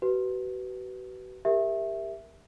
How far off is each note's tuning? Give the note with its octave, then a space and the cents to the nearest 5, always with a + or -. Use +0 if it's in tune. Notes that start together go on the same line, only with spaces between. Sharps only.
F#4 +40 B4 +0
G4 +20 A#4 +0 E5 +0